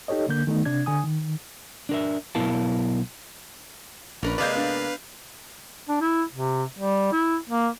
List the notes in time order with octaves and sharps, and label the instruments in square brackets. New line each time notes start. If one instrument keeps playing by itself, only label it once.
[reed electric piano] D#4 G4 A4 C#5 D#5
D3 A#3 G6
D#3 A3 B3 D#4
C3 D4 G#6
D3 G#5 D#6
D#3
[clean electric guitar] D4 A#4 E5
B1 B3 E4 A#4 F5 A5
[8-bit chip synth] A#1 [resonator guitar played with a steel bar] C#4 A#4 B4 [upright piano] D4
[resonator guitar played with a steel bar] C3 G#3 A#3 [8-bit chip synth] B4 F5 [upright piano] D5 G6
[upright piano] B3 D4
[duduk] D4
E4
C3
G3
E4
A#3